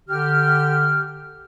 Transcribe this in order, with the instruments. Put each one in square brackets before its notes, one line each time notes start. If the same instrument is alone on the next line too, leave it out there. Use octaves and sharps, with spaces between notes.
[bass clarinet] D3 [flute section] G4 F6